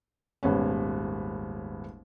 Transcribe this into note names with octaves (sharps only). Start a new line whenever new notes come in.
D#1 G#1 B3 C#4